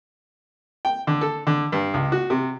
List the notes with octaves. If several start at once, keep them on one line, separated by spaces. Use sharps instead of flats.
G5
D3
A4
D3
G2
C#2
F#4
C3